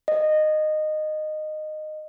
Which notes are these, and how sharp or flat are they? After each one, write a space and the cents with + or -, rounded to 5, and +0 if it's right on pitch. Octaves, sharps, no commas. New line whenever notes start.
D#5 -15